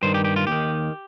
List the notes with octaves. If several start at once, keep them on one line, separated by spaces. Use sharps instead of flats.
G2 D#3 C5
G4
G4
F4
D#2 D#3 G4